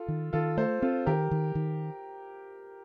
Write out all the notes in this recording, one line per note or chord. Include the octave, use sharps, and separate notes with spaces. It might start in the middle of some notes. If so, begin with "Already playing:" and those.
Already playing: F4 A4
D#3
D#3 F4 A4
A3 A4 C5
C4 F4 A4
D#3 G4 A#4
D#3
D#3